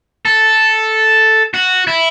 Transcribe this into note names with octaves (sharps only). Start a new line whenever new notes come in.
A4
F#4
E4